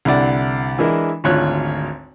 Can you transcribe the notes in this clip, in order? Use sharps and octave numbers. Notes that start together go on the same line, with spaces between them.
C2 D3 E4 D5 F#5
E3 G#3 D4 E4 A#4
G#1 D2 F4 C#5 F#6